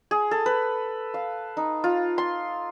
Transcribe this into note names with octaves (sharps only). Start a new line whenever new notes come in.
G#4
A4
B4
F5
D#4
F4
C6